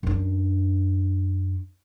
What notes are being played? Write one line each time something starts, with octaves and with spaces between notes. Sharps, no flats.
F#2 D4